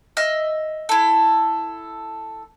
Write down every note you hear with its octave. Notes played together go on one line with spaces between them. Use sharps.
D#5 E5 F6
E4 A4